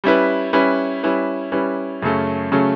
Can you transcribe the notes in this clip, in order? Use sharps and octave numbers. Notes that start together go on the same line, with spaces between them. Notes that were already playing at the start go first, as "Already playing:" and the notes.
G3 C#4 E4 B4
G3 C#4 E4 B4
G3 C#4 E4 B4
G3 C#4 E4 B4
F#2 C#3 F#3 A3 C#4
C#3 F#3 A3 C#4